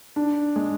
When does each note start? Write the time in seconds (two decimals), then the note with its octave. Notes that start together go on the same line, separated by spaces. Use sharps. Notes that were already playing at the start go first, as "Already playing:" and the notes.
0.16 D4
0.56 G#3